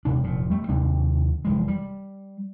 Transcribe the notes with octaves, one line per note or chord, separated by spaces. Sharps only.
D#1 C3 D4
F1 A#2
G3 A3
D#2 C3 C4 D4
F1 E3 G#3
G3